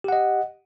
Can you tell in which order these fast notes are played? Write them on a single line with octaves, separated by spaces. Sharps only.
G4 F#5 D#5